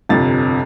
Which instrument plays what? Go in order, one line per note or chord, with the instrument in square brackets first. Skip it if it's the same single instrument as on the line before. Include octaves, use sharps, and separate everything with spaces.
[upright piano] G1 F2 C3 A6